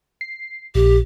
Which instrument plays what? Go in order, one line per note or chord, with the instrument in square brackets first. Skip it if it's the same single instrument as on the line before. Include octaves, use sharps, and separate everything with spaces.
[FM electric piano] C7
[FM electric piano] A#1 [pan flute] G4